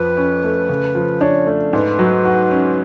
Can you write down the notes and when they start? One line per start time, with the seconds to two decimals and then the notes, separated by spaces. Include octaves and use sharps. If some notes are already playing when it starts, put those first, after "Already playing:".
Already playing: F2 F3 B4
0.17 C#4
0.43 A3
0.69 C#3
0.95 F3
1.21 D4 C#5
1.47 A3
1.73 G#2 B4
1.99 F#3
2.25 F#4
2.51 C#4